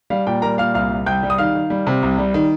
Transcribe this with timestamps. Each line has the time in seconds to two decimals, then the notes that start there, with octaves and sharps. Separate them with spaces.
0.10 G3 F5
0.27 A#2 G5
0.42 G3 A#4 A#5
0.58 A#2 F5 F6
0.74 C2 F5 F6
0.90 C2
1.06 C2 G5 G6
1.23 G3
1.30 D#6
1.38 D#3 F5 F6
1.55 D#3
1.70 G3
1.87 C3
2.03 C2
2.18 G3
2.34 D#3